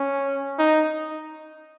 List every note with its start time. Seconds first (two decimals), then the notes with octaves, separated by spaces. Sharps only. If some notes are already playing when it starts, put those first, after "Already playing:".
Already playing: C#4
0.59 D#4